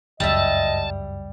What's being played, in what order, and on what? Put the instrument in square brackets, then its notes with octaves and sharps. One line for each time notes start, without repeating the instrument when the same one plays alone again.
[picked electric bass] G1 C#2 F#2 [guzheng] G3 E5 [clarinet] D#5 [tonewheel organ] A5